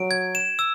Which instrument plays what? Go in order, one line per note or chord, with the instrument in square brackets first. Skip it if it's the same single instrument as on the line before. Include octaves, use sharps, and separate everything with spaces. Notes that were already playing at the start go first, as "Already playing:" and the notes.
Already playing: [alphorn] F#3 [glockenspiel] D7
[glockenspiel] G#6
E7
E6